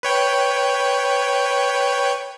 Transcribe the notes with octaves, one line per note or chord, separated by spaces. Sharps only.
B4 C#5 G5